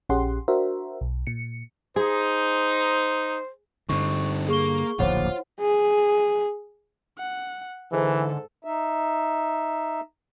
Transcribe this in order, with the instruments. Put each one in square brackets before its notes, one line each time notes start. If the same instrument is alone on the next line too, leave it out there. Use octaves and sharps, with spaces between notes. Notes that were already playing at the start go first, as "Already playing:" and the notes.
[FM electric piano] A#1 C#4 G4 G#4 F#5 C6
D4 F#4 A#4 C5 E5
B1
A#2 C#7
[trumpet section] D#4 [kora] G#4 [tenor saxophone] C5
[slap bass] G2 D3 [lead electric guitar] C4 D#4 [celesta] C#6
[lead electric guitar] A#3 [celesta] G#4 C#6 G7
[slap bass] D1 A#1 D#2 [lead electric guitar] F4 [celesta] C5 C#5 F#5
[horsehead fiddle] G#4
[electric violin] F#5
[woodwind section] G#2 [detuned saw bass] D3 [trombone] E3 [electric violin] A4
[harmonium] D#4 E5